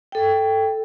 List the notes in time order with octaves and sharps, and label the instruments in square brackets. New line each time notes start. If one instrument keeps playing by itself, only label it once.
[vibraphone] A4 G5